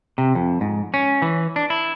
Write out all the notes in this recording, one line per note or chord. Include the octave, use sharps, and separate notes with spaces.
C3
F2
G#2
C#4
E3
D4
E4